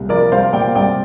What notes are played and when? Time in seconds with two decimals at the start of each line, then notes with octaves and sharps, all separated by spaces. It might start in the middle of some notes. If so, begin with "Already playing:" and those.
Already playing: C2 A#2
0.09 F3 A#4 D5
0.32 C2 C5 F5
0.53 A#2 D5 G5
0.75 C2 D5 G5